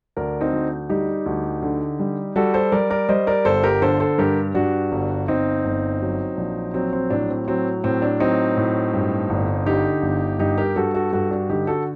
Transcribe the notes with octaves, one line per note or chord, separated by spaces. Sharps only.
D2 A#4 D5
C4 D#4
D2
G3 D#4 G4
D2
D3
G3
G3 F#4 A4
A4 C5
G3 A#4 D5
A#4 D5
G3 C5 D#5
A#4 D5
G1 A4 C5
G4 A#4
D3 A4 C5
A4 C5
G2 G4 A#4
G2 D4 F#4
G1
G1 C4 D#4
G1
F#3
A#1
F#3 C4
C4
A2 D4
C4
F#3 C4
A2 C4
D4
F#3 C4 D#4
A2
G2
G1
D3 D#4 G4
G1
G2 D#4 G4
G4 A#4
G2 F#4 A4
F#4 A4
G2 F#4 A4
D4 F#4
D3 D#4 G4
F#4 A4